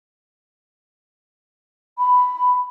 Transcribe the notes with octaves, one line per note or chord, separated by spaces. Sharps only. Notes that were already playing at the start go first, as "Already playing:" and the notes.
B5